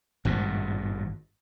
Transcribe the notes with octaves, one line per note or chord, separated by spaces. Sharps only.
G#1 G2 A#2